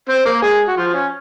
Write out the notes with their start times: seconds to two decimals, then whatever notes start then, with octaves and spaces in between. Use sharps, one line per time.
0.09 C4 C5
0.26 A#3 A#4
0.42 G#3 G#4
0.68 F#4
0.77 F3 F4
0.94 C#4